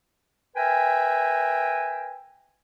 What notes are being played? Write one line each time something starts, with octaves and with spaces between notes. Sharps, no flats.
A#4 B4 E5 G5 G#5